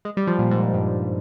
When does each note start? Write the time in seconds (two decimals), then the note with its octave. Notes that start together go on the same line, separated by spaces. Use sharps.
0.05 G#3
0.17 G3
0.27 F3
0.39 A#2
0.51 G#2
0.73 G2